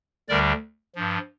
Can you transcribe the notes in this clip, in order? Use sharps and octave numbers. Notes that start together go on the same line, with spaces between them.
D2 D3 G3 A#4 D5
G2 F3